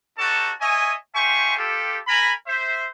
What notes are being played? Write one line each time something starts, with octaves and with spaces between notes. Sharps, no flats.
D#4 F#4 G4 A4 C#5 A5
C#5 D#5 E5 G#5
F4 G4 C5 E5 G#5 C#6
F4 G4 A4
A#4 G#5 A#5 B5
C5 E5